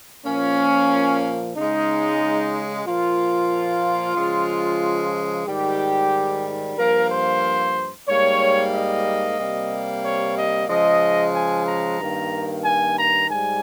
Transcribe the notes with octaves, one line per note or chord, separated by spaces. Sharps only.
A#2 F3 A#3 C#4
C#3 G#3 D#4
A#2 F3 A#3 F4
C#3 F3 G#3
G#2 D#3 G3 G4
G2 F3 A#3 A#4
C5
G#2 G3 A#3 C#5
D#5
C3 G3 A#3
C#5
D#5
C#3 F3 G#3 D#5
G#5
A#5
G2 D#3 A#3
G#5
A#5
G#2 G3 G#5